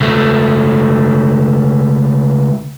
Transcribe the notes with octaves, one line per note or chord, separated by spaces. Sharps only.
C#2 A3